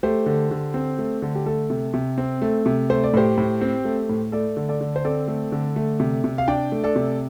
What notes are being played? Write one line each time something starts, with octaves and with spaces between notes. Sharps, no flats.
A3 G4 C5
D3
D3
C4
A3
D3
G4
A3 A4
C3
C3
C4
A3
C3
A3 C5
D5
A2 G4 C5
A2
C4
A3
A2
A3 A4 D5
D3
A4 D5
D3
C5
C4 A4 D5
A3
D3
A3
C3
C3
F5
D4 D5 G5
A3
A4 D5
C3